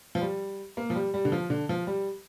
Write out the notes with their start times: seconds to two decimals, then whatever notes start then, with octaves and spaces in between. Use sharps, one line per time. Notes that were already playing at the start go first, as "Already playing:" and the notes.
0.15 F3
0.21 G3
0.77 A#3
0.90 F3
0.95 G3
1.14 G3
1.25 D3
1.32 F3
1.50 D3
1.69 F3
1.87 G3